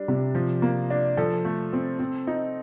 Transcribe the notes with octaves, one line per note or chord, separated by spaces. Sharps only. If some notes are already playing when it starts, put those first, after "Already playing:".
Already playing: G3 D4
C3
F3
A#3
D4
F3 A4
A3
C4
C4
D#4